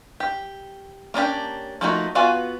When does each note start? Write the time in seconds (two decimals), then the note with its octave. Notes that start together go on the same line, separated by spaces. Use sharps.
0.20 G4
1.14 A#3 C#4 D4 G4
1.81 F3 A3 A#3 D#4 F#4
2.15 B3 F4 F#4 F5 G#5